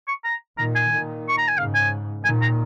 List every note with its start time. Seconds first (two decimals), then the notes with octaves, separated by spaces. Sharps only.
0.08 C#6
0.24 A#5
0.58 A#2 D#3 A#5
0.75 G#5
0.92 A#2 D#3
1.29 C#6
1.38 A#5
1.48 G#5
1.58 G#2 C#3 F5
1.75 G#5
2.25 A#2 D#3 G#5
2.42 A#5